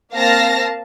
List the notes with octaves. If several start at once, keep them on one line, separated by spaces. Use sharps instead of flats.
A#3 C4 F5 A5 A#6